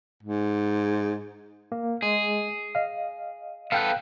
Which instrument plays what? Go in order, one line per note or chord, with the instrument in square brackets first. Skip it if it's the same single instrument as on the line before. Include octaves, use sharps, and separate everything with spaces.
[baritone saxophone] G#2
[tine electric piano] A#3
[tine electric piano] G#3 [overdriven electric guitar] G#4
[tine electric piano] D#5 F5
[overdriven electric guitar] B3 A4 [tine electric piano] F5 G5 F#6